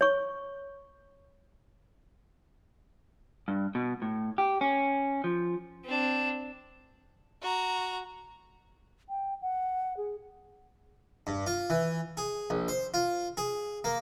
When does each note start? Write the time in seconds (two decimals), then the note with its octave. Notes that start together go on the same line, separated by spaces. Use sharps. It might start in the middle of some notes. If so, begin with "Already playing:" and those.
0.01 C#5 C#6
3.48 G2
3.75 B2
4.02 A2
4.38 G4
4.61 C#4
5.24 F3
5.84 C4 D4
7.42 F#4 A#5
9.09 G5
9.42 F#5
9.97 G#4
11.27 G2
11.46 F4
11.70 E3
12.17 G#4
12.50 A#1
12.68 C5
12.94 F4
13.37 G#4
13.84 A#3